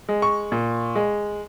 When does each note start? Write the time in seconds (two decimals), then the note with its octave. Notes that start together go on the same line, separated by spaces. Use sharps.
0.09 G#3
0.22 C#6
0.52 A#2
0.95 G#3